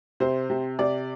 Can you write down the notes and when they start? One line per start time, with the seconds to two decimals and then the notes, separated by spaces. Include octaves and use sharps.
0.20 C3 C5
0.50 C3
0.79 C3 D5